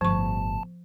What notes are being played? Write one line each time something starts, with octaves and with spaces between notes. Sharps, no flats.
G1 A2 F3 A5 C#6